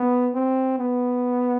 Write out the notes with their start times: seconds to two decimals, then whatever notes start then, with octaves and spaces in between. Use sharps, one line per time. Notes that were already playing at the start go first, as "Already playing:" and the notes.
Already playing: B3
0.35 C4
0.79 B3